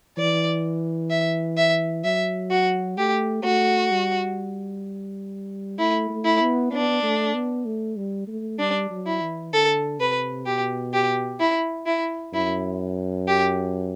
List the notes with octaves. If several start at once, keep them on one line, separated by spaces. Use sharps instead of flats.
E3 D5
E5
E5
F#3 E5
F#4
A3 G4
A3 F#4
G3
A3 E4
A3
E4
B3
B3 D4
A3
B3
A3
G3
A3
G3 D4
F#3
E4
E3
D3 A4
C3 B4
B2 G4
G4
E4
E4
F#2 E4
G4